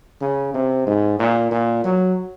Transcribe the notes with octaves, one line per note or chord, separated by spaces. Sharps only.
C#3
C3
G#2
A#2
A#2
F#3